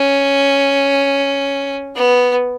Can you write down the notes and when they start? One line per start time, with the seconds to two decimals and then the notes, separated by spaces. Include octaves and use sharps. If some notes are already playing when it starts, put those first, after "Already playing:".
Already playing: C#4
1.96 B3